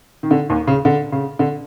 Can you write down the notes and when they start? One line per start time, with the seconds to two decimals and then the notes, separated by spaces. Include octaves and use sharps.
0.23 D#3
0.31 D3
0.49 D#2 D#3
0.67 C#3
0.85 D3
1.12 C#3
1.39 D3